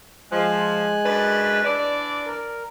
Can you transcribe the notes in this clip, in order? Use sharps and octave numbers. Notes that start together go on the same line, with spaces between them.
F3 G#3 G#5 F#6
F#2 D4 B4
E3 D4 D5
A#4